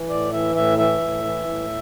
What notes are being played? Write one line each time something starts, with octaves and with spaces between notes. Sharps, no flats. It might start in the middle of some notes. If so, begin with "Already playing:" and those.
Already playing: E3
A2 D5
E3 E5
A2 E5
E3 E5
A2
E3
A2